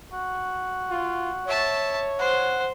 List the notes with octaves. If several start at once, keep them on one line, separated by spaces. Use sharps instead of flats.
F#4
F4
C#5 E5 A5
C5 F#5